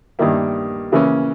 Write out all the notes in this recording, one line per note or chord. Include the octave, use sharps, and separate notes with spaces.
G2 D#3 A#3 E4
C#3 E3 A#3 C#4 E4